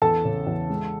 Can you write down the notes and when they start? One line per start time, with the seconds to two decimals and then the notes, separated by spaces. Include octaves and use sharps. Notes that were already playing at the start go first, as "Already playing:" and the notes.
0.02 E2 A4 A5
0.25 C#3
0.47 E2
0.70 G#3